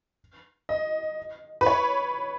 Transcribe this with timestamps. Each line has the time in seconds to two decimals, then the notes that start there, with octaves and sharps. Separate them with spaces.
0.69 D#5
1.61 B4
1.66 C#5